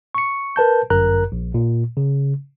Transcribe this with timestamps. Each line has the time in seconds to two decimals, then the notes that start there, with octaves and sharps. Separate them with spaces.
0.15 C#6 C#7
0.56 A#4 B4 A5 G6
0.90 G1 F#2 A#4 A#5 F#6
1.32 A#1
1.54 A#2
1.97 C#3